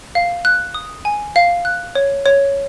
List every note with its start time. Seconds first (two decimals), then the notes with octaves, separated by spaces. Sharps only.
0.15 F5
0.45 F#6
0.74 D#6
1.05 G#5
1.36 F5
1.65 F#6
1.95 C#5
2.26 C#5